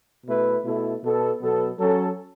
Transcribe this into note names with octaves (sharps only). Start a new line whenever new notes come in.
B2 A3 E4 B4
B2 A3 E4 A4
B2 B3 A4
B2 F#3 B3 A4
F#3 C#4 A4